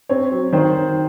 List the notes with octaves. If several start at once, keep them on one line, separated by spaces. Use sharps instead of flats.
C4 C#5
F#3
D#3 C5